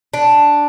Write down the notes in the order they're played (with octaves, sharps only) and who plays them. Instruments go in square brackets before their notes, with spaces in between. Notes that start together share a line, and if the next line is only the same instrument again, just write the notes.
[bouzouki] D4